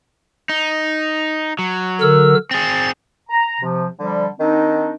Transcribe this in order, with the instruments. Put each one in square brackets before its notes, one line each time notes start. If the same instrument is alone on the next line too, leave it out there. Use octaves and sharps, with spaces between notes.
[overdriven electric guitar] D#4
F#3
[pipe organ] D3 A#4 E6
[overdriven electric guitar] C4 G#4 [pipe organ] A6
[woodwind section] A#5
C3 F3
D3 F3 G3
D#3 C4 D4 D#4